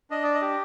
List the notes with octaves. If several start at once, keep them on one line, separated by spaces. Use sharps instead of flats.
D4 D#5
D5
D#5
G4